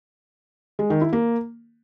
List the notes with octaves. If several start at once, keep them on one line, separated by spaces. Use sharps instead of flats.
G#3
D#3
E4
A#3